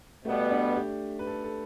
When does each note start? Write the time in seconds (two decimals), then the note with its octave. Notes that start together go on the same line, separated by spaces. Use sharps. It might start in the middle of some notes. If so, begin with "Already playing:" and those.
0.24 B2 G3 A3 B3
0.51 D4
0.76 G4
1.19 B4
1.27 A4
1.44 A4